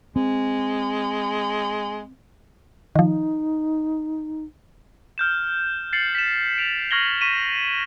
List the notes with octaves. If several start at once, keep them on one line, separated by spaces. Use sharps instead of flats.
G#3 C4
D#3 F3 D#4
F6 G6 E7
A6 C7 C#7 F#7
B6 E7
D7 F7
C#6 F6 G#6 A#6 F#7 G7
C#6 B6 D#7 E7